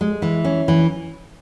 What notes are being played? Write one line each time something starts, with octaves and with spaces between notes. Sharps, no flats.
G#3
E3
C#4
E3